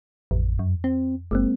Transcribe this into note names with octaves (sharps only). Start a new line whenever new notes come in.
A1 F2
F#2
C4
F#1 G#3 A#3 C4